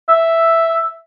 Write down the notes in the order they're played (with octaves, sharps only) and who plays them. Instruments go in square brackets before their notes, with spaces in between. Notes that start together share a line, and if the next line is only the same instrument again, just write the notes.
[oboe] E5